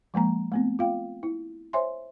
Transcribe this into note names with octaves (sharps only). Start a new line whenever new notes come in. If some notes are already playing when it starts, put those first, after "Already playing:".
F3 G#3 A#3 A#5
A3 B3 C4
F4 F5 G5
E4
C5 C#5 E5 G#5 C6